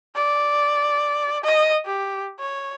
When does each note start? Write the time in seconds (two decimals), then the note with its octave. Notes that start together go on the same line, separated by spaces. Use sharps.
0.15 D5
1.44 D#5
1.86 G4
2.40 C#5